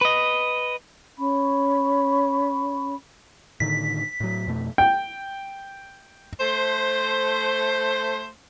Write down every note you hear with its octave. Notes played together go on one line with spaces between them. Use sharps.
B4 D#5
C#4 B5 C#6
A2 D3 D#3 B6
A2 F#3
F2 B2 A3
G5
A3 C5